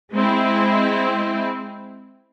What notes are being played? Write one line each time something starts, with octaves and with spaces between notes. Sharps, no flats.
G#3 C4 E4